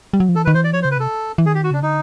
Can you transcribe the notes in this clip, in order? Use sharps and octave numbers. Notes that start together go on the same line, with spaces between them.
G3
F#3
F3
E3 A4
D#3 B4
E3 C5
D5
F3 C#5
C5
C#3
B4
C3 A4
E3
D#3 G#4
G4
F#4
C#3 D4
D3 D#4